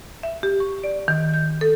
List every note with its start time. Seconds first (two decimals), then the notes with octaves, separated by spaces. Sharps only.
0.23 E5
0.43 G4
0.60 C#6
0.84 D5
1.08 D#3
1.34 G6
1.61 A4